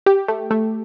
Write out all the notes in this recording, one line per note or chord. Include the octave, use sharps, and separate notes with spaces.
G4
A3
A3